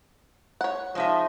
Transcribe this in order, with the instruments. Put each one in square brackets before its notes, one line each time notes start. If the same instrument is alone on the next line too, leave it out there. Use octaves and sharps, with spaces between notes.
[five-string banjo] C#5 F#5
[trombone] F3 [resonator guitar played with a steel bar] G#3 D#4 E5